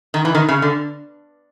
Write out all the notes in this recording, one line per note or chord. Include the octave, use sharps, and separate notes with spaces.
D#3
E3
D#3
C#3
D3